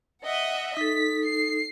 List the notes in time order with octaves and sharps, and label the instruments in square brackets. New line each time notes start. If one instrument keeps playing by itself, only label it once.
[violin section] D#5 E5 F#5
[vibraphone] D#4 A4 [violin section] B6
[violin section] C7